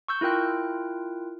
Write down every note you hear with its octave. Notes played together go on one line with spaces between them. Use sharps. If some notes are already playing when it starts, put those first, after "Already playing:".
C#6 E6 G6
E4 F4 A#4 G5 F#6